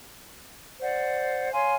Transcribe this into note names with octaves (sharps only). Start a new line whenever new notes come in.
C5 D5 F#5
C#5 F5 G#5 C6